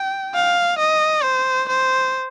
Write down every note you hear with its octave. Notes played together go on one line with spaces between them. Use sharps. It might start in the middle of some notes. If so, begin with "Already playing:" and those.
Already playing: G5
F5
D#5
C5
C5